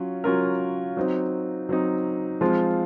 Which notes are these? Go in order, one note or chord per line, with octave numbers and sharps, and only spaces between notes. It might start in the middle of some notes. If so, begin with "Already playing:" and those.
Already playing: F#3 C#4 F4
F#3 C#4 F4 A#4
F#3 C4 D#4
F#3 C4 D#4
F3 G#3 C4 F4